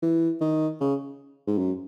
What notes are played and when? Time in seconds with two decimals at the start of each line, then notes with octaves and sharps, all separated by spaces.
0.02 E3
0.41 D#3
0.80 C#3
1.47 G#2
1.58 F#2